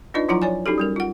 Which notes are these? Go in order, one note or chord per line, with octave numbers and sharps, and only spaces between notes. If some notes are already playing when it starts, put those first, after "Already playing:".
D4 D#4 F4 B4 D5 D#5
F3 F#3 E4 F4 F#5 A#5
C#5 D5 G#5
C#4 D#4 F#4 G4 A4
G3 C#4 A#4
F4 F#5